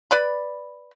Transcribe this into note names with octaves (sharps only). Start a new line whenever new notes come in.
B4 D5 B5